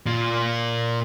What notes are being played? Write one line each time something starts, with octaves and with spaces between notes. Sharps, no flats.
A#2 F4